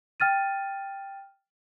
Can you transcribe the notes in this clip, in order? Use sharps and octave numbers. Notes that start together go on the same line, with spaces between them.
G5 F6 A6 D#7